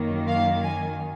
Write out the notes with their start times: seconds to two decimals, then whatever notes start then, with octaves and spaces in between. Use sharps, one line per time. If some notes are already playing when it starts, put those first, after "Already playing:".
Already playing: F#2 D#3 A#3
0.28 F5
0.62 G#5